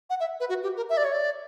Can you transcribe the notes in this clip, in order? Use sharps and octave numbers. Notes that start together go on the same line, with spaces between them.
F#5
E5
B4
F#4
G4
A#4
E5
D5
C#5
D5